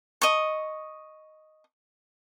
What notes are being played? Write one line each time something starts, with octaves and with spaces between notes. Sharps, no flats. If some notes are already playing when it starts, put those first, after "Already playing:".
D#5 C#6